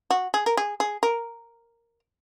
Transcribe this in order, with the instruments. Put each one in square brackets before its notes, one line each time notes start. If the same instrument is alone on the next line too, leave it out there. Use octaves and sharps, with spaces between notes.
[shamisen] F#4
G#4
A#4
G#4
G#4
A#4